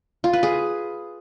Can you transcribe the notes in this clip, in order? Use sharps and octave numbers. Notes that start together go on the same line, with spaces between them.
F4
B4
G#4